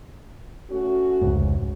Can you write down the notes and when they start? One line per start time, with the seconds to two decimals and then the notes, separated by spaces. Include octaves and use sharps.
0.70 A3 C#4 F#4
1.21 F1 C#2 G#2